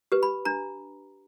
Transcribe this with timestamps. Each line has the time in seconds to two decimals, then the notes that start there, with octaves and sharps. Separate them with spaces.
0.12 G4 B4
0.23 B5
0.45 D4 A#5